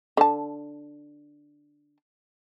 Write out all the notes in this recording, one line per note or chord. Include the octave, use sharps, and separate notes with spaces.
D3 A5